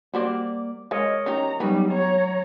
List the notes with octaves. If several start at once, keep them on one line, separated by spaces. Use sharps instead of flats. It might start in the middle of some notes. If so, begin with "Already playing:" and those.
G3 A#3 F#4 C5 D5
G#3 A#4 C#5 D#5
C#4 D#4 G4 A#5
F#3 G3 B3 C#4 D#4 B4
C#5 A#5